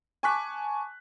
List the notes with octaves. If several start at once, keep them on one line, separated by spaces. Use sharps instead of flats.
G#5 A5 C#6 D6 F#6 B6